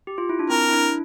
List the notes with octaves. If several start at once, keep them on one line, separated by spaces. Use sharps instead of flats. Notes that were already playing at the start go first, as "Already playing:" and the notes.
G4
F4
E4
D4
C4 A#4
E4
D4